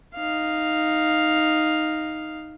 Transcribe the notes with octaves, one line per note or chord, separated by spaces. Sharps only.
D#4 F5